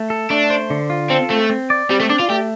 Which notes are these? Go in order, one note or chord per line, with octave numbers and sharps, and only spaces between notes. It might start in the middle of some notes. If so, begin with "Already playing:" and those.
Already playing: A3
A4
A3 D4
C5
D3
F4
C4 A4
A3 C4
C4
D5
G3 C4
A3
D4 D5
F4
A3 G4